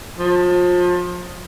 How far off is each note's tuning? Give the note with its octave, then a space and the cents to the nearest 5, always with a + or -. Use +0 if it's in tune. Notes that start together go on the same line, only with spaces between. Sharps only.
F3 +30